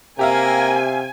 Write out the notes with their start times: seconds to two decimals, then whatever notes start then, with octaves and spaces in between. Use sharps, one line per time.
0.19 C3 A#3 G4 A#4 E5 F5 G#5